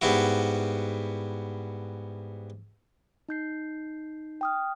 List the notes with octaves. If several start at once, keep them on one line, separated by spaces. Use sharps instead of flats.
G#2 G3 B3 E4 F#4
D#4 G6 C7
G5 D#6 F6